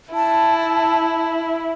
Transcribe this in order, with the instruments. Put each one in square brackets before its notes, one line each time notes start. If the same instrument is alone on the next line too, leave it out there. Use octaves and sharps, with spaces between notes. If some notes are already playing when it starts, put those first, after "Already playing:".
[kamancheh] E4 [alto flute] A5